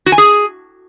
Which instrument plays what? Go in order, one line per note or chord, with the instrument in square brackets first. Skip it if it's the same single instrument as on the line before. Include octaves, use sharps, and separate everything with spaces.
[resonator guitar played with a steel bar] F#4
G#5
G#4